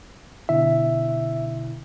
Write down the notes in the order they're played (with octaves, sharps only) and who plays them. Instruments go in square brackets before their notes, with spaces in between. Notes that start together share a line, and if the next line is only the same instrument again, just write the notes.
[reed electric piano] B2 D3 E4 [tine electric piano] E5